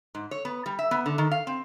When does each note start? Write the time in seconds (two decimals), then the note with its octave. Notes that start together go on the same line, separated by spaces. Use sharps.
0.15 G#2
0.31 C#5
0.45 B3
0.66 G3
0.79 E5
0.91 B3
1.06 D3
1.18 D#3
1.31 F5
1.47 C4